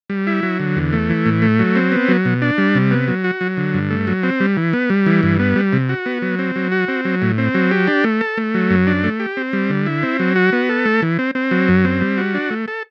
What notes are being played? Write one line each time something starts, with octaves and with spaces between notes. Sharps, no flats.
G3
E4
F#3
D3
E2
A3
E3
A2
A3
F#3
C4
B3
F#3
B2
D4
G3
C3
B3
F#3
F#4
F#3
D3
G2
A3
F#3
C4
G3
E3
B3
G3
E3
G2
B3
G3
C3
F#4
B3
F#3
C4
F#3
F#4
C4
F#3
A2
C4
F#3
G4
D4
A3
A4
A3
F#3
F#2
D4
A3
G4
C4
G3
D3
E4
C4
F#3
F#4
B3
A4
A3
E3
C4
C4
F#3
F#2
C4
G3
F#4
D4
A3
A4